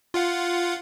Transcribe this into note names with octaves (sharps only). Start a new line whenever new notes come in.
F4 F5 F#5